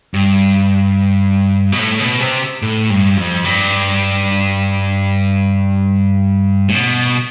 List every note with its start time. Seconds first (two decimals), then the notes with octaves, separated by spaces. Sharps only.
0.14 G2
1.72 B2
1.79 A2
2.00 B2
2.20 C3
2.62 A2
2.90 G2
3.17 F2
3.45 G2
6.69 A2
6.75 B2